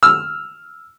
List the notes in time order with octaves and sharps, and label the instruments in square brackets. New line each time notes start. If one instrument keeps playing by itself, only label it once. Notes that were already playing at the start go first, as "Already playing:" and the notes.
[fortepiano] E6 F6